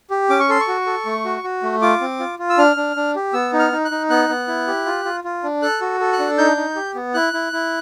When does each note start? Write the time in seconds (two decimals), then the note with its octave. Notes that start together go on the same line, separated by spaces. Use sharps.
0.10 G4
0.30 C#4 D6
0.40 C#6
0.49 A4 C6
0.61 C#6
0.68 F#4
0.86 A4
1.06 A3
1.25 F#4
1.44 F#4
1.63 A3
1.82 F4 D6
2.01 C4
2.20 F4
2.39 F4
2.50 E6
2.58 D4 F6
2.76 D4
2.96 D4
3.16 G4
3.33 B3 E6
3.53 D#4
3.59 F6
3.72 D#4
3.85 F#6
3.91 D#4
4.10 B3 F#6
4.29 B3
4.48 E4
4.67 G4
4.86 F4
5.05 F4
5.24 F4
5.43 D4
5.62 A4 F#6
5.81 F#4
6.00 A4
6.13 F#6
6.19 D4
6.38 D#4 G6
6.57 D#4
6.76 G4
6.95 B3
7.14 E4 F#6
7.33 E4
7.53 E4